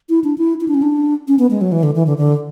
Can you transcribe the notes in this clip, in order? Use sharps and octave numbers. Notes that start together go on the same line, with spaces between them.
E4
D4
E4
E4
D4
C#4
D4
C#4
B3
G#3
F#3
E3
D3
E3
D3
D3